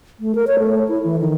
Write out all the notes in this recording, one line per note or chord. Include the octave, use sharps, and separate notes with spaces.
A3
A#4
C#5
A3
E4
E3
D#3